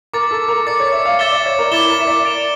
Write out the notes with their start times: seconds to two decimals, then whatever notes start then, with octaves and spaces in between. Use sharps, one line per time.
0.13 A#4 D6 A6 C#7
0.31 A4
0.48 A#4
0.67 D5 D6 A6 C#7
0.80 C#5
0.92 E5
1.05 F5
1.19 E5 D6 A6 E7 G7
1.32 D5
1.46 C#5
1.58 A#4
1.71 E4 D6 A6 E7 G7
1.90 A#4
2.00 E5
2.07 D5
2.25 A6 D7 F7